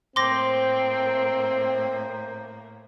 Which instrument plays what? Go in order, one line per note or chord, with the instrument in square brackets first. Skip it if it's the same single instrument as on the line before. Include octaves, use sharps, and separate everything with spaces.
[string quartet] A2 A#3 [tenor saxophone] C4 [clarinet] C5 [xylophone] C6 D6 A#6